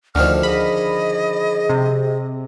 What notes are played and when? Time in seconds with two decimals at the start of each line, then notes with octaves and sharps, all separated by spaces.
0.15 D2 D3 D#3 F3 F6
0.43 G#4 D#5 B5
1.69 C3